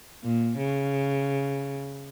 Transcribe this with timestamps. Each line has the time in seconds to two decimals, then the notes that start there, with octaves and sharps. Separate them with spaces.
0.23 A#2
0.57 C#3